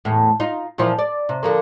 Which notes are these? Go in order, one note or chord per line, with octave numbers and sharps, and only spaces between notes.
E2 A2
D#4 F4
A#2 E3 F3
D5
C3
D3 F3 A#3